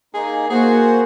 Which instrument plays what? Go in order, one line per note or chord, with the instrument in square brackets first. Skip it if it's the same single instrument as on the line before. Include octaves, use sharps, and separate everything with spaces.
[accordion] A#3 D#4 [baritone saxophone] G#4
[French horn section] A#3 [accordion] F#4 C5 F#5 [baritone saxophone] G#4